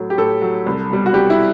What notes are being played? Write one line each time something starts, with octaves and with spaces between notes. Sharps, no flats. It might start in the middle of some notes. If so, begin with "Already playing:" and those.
Already playing: A2 F#3
G4
A2 A4
F#3
C2
B2 G3
F#4
C2 G4
E4